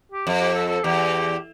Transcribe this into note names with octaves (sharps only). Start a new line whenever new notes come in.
G4
F2
G4
A4
A4
E2 G4